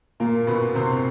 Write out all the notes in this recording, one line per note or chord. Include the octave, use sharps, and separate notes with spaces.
A#2 A#3
B2 B3
C3 C4